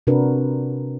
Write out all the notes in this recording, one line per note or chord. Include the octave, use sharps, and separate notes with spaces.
C3 D4 F#4 A#4 B4